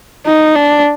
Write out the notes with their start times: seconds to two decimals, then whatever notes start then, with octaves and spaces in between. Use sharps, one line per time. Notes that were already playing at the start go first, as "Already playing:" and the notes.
0.26 D#4
0.55 D4